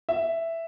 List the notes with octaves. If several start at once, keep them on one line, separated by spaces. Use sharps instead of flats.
E5